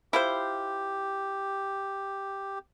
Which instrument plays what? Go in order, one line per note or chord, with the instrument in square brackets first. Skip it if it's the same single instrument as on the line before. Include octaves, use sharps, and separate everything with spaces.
[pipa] E4 F4 C5 [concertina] G4